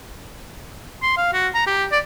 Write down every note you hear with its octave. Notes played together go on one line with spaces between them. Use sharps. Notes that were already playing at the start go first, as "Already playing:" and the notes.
C6
F5
F#4
A#5
G4
D5